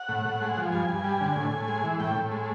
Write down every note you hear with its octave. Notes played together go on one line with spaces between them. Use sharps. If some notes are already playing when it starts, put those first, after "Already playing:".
Already playing: F#5
A2
A2
G#3
F3
G2 G#5
G2
G3
D3
A2
A2
G#3
E3
A2 G5
A2
G#3